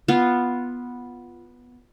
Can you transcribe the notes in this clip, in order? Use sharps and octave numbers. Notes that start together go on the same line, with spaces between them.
B3 F4